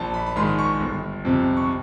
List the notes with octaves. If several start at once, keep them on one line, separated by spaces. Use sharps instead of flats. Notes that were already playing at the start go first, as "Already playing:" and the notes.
Already playing: A#1 A5
B5
B5
G#2 D#3 G#3 C6
C#6
G1
F2 C3
C#6